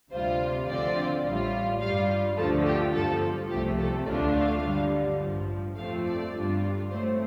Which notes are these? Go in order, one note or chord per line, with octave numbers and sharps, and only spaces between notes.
D2 C3 G3 F4 C5
D2 D3 F3 C4 F4 D5
A1 A2 G3 F4
G2 G3 F4 F5
D2 D3 F3 A3 F4 A4
G4
G1 G2 F3 A4
C2 C3 F3 A3 G4
A4
D2 D3 A3 D4 F4 D5
F5
G2 D3 G3
A1 G2 F3
F2 F3 A3 C4 F5
D5
G1 G2 G3 D4 F4
A2 A3 C4 C5